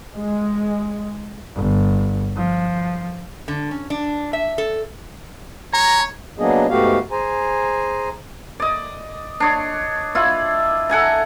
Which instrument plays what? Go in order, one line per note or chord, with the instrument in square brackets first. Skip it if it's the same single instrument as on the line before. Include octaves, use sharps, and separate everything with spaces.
[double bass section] G#3
[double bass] G1
F3
[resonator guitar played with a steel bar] D3
C#4
D4
E5
A4
[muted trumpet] C#5 [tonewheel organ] A#5
[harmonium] F#3 A#3 B3 D4 G#4 D#5
G#2 A3 B3 F#4 G4 F5
G#4 C5 G#5 A#5
[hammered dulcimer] D5 D#5
D4 C#5 D#5
E4 F4 D5
A4 F#5 G#5 A#5